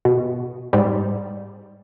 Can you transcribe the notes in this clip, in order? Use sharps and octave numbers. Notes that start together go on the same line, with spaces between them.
B2
G#2 G3